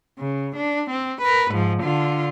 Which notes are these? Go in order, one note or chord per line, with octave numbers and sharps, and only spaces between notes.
C#3
D4
C4
A#4 B4
G#2 F3
D3 F4